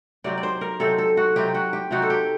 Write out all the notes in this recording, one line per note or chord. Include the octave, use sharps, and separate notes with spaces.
C3 F#3 C4 D#4 D5
D5
C5
A#4
C3 F#3 C4 D#4 A4
A4
F#4
C3 F#3 C4 D#4 G4
F#4
G4
C3 F#3 C4 D#4 F#4
A4
G4